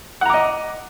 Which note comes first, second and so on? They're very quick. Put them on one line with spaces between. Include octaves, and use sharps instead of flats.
F#5 A#5 D6 D#5